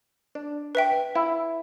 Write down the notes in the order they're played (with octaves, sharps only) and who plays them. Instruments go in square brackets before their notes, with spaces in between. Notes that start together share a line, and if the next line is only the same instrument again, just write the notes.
[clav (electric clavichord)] D4
[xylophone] B4 E5 G5
[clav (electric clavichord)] E4